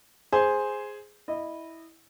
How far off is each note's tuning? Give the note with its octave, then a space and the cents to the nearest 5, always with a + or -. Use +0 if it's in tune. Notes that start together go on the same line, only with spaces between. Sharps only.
G#4 +0 C5 +0
E4 -10 D#5 -25